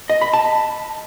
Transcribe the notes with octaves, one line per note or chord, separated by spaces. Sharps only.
D#5
B5
A5